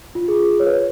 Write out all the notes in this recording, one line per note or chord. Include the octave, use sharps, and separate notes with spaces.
F4
G#4
C#5
B4